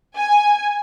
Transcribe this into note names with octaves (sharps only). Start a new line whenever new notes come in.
G#5